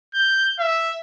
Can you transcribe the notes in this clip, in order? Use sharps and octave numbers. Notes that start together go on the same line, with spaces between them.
G6
E5